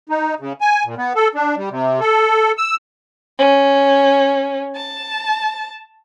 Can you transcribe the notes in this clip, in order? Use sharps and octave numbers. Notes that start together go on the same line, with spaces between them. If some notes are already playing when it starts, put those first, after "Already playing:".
D#4
C#3
G#5
A#2
B3
A4
D4
G3
C3
A4
E6
C#4
A5